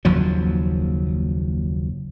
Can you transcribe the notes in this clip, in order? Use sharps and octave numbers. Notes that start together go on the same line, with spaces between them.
F#1 D#2 F3 F#3